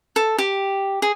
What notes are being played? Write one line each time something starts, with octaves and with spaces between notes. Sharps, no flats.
A4
G4
G#4